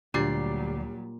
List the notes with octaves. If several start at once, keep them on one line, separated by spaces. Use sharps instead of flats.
D2 A#2 F#3 G3 D4 G4 D5 C7